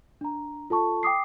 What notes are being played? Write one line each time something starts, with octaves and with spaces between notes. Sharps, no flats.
D4 A#5
F4 A4 A5 C#6
G5 D6 D#6 C7